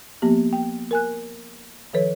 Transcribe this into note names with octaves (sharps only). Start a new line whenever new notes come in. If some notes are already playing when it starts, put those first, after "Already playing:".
F3 A#3 B3 G4
G5
A#4 G#5 F#6
D#3 F3 A4 B4 C#5